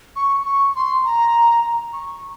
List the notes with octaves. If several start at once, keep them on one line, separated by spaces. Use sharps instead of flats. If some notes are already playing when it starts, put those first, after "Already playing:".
C#6
C#6
C6
A#5
C#6